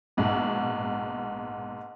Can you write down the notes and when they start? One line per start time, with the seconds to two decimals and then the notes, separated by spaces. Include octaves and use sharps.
0.17 A#1 G#2 B2